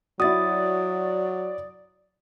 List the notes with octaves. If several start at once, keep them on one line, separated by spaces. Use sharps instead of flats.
F#3 E4 F#4 D5 D#6 A6